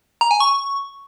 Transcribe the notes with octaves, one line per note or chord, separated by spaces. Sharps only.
A#5
G#5
C#6